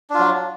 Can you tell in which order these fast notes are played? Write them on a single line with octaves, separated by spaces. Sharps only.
D4 F4 F#3